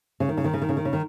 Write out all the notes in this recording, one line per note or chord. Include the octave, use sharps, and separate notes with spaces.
C#3
D#3
C#3
D#3
C#3
D#3
C#3
D#3
C#3
D#3